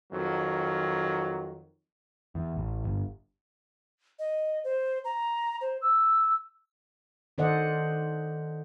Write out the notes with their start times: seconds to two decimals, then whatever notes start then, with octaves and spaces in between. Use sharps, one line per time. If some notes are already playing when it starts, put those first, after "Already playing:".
0.11 F2 D#3 F#3
2.35 E2
2.56 A1
2.84 G1
4.19 D#5
4.64 C5
5.04 A#5
5.61 C5
5.82 E6
7.38 D#3 A4 C5 D5 D#5 F#5